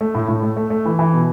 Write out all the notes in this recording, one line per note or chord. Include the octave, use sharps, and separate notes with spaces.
A3
A2
A2
A3
A3
A3
E3
E3
B2